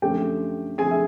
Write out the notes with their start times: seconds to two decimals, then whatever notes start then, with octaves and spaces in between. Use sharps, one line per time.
0.02 F#2 D3 F3 A3 C4 G4 G5
0.78 D3 F3 A3 C4 G#4 G#5
0.91 E5